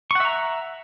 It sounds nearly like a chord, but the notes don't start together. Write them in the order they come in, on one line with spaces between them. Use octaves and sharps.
C#6 F#5 E5 A#5